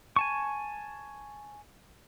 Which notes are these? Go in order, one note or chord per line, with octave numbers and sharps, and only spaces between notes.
G#5 A5 C#6